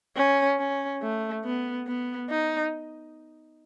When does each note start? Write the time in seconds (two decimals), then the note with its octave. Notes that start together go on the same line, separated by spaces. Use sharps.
0.16 C#4
0.59 C#4
1.02 A3
1.45 B3
1.87 B3
2.30 D#4